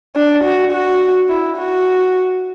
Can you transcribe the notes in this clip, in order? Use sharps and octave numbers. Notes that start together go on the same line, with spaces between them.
D4
F#4
F#4
E4
F#4